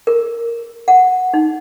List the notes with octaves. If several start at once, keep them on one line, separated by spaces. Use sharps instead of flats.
A#4
F#5
D#4